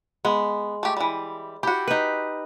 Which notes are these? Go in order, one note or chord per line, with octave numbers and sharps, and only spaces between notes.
G#3 B3
A3 G4
E3 G3
E4 F#4 G4
D#4 B4